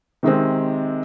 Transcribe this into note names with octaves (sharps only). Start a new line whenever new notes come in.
C3 D#3 G#3 C4